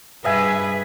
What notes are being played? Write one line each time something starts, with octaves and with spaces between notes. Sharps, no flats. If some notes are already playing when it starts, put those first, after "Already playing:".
G2 G#4 B4 D#5 E5 G#5